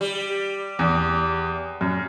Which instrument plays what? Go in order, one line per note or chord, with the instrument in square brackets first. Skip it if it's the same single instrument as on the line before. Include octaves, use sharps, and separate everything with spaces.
[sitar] G3
[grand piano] E2
F#2